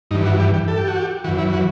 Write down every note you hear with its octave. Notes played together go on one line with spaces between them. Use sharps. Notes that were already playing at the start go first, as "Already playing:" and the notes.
G2 E3 D#4
F#4
G4
G4
A4
G4
F#4
G4
F#2 E3 F#4
E4
F#4